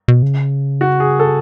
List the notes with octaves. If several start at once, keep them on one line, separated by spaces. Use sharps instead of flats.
B2
C#3
F#4
G#4
A4